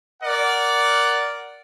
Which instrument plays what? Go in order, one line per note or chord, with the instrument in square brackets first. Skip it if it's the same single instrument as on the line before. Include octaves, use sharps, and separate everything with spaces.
[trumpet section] A#4 D5 F#5